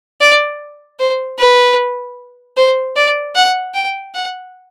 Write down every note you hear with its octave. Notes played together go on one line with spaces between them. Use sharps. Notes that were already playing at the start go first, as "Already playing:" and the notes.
D5
C5
B4
C5
D5
F#5
G5
F#5